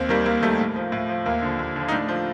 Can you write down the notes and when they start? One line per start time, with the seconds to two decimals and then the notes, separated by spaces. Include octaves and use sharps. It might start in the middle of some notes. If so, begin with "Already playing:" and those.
Already playing: D#2 C4
0.09 D#3 G3 A#3
0.26 D#2 A#3
0.42 D#3 G3 A3
0.59 A2
0.76 F3
0.92 A2
1.09 F3
1.26 D#2 A#3
1.42 D3 F3
1.59 D#2
1.76 D3 F3
1.88 D#4
1.92 A2 D4
2.08 F3